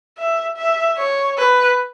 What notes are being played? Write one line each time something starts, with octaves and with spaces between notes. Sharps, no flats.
E5
E5
C#5
B4